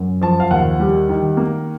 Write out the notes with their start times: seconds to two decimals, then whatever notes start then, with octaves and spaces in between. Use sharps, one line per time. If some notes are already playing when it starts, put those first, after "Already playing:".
Already playing: F#2
0.21 F3 A5
0.40 F5
0.51 D#2 F#5
0.80 G3
1.09 D#3
1.37 A#3